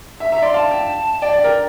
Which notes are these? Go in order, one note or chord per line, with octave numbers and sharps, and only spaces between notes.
E5
E5 A#5
D5 C6
F5 A5
G5
D5 G5
D5
A#4